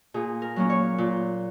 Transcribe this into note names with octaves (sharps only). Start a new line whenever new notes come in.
A#2 G#4
A#4
F#3 A#3 C#4
C#5
A#2